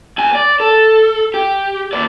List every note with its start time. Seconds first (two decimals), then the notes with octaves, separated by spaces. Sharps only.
0.18 E2 G#5
0.35 D5
0.60 A4
1.34 G4
1.93 D#2 D5